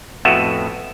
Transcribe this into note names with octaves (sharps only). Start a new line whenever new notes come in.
F2 A2 B3 F#4 E5